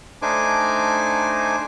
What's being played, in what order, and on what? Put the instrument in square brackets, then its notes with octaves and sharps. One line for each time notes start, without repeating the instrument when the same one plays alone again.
[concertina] A3 D4 D#4 C5 G#5 D6